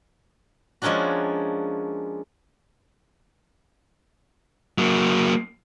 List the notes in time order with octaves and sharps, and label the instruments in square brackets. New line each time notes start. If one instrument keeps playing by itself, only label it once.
[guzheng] F3 G#3 A#3 C#4 D4 F#4
[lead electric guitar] F#3 A#3